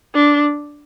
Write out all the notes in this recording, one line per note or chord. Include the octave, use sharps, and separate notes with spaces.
D4